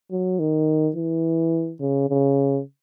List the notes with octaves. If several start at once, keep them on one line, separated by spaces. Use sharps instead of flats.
F#3
D#3
E3
C#3
C#3